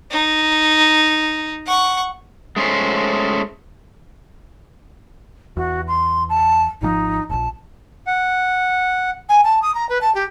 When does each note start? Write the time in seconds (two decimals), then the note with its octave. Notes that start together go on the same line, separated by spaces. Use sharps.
0.11 D#4
1.66 F#5 C#6
2.56 G#3 A3 C#4 C5
5.57 E2 F#4
5.88 C6
6.29 A5
6.82 G#1 D3 F3 D#4
7.30 E1 A#1 A5
8.07 F#5
9.29 G#5
9.44 A5
9.62 D#6
9.75 A#5
9.89 B4
10.01 A5
10.15 G4